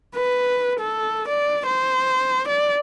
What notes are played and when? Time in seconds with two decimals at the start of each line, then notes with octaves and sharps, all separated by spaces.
0.15 B4
0.79 A4
1.28 D5
1.66 C5
2.48 D5